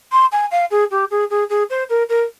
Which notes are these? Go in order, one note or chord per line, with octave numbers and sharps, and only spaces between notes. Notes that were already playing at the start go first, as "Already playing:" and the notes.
C6
G#5
F5
G#4
G4
G#4
G#4
G#4
C5
A#4
A#4